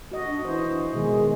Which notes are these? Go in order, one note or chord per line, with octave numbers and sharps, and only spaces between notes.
F#4 D#5
D4
E3 C5
B2 D#3 G#3